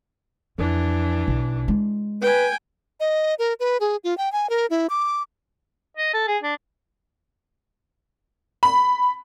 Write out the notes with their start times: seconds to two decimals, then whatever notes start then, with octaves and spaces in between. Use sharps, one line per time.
0.59 F2 E3 D4
1.27 B1
1.68 G#3
2.22 B4 G5 G#5
3.00 D#5
3.39 A#4
3.60 B4
3.80 G#4
4.04 F4
4.18 G5
4.32 G#5
4.50 A#4
4.70 E4
4.90 D6
5.97 D#5
6.14 A4
6.28 G#4
6.42 D4
8.63 B5